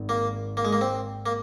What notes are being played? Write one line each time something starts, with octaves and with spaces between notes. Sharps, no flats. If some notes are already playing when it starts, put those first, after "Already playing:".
Already playing: G#1 D#3
A#3
A#3
G#3
A#3
C4
A#3